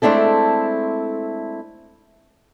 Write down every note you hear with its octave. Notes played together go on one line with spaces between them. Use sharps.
G#3 A3 C4 D4 E4 A4